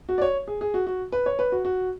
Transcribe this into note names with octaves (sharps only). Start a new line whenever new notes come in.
F#4
D5
C#5
G#4
G#4
F#4
F#4
B4
C#5
B4
F#4
F#4